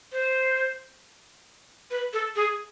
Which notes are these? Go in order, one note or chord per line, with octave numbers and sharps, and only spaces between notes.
C5
B4
A4
G#4